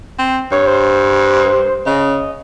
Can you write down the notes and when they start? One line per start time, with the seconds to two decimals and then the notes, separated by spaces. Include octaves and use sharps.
0.19 C4
0.51 G2 C#5
0.67 C5
1.86 C#3 D#5